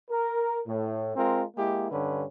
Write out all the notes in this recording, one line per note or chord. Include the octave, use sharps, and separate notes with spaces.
A#4
A2
G#3 C4 F4 A#4
G#3 A#3 E4 G4
G2 D3 C#4 B4